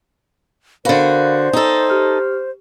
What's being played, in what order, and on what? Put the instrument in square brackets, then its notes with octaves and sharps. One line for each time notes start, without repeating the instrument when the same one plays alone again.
[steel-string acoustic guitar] D3 F#4 [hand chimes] A#4 F5 B5 [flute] C5
[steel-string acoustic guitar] D#4 A4 [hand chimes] G5
[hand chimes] G4 F6